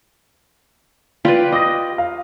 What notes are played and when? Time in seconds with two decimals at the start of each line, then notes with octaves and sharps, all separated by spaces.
1.25 F4 G4 B4 D5 B5
1.52 D#5 D6 D#6 A#6
1.98 F5